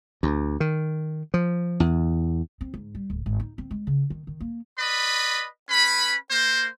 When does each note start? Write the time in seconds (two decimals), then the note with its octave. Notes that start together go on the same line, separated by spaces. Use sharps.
0.23 D2
0.60 D#3
1.34 F3
1.80 E2
2.61 C4
2.74 G#2
2.95 G3
3.10 D1
3.26 G#1
3.40 D#4
3.58 C4
3.71 G#3
3.87 C#3
4.10 D#3
4.27 D#3
4.41 A#3
4.78 B4 D5 D#5 B5
5.69 C#4 B4 B5
6.30 A#3 C5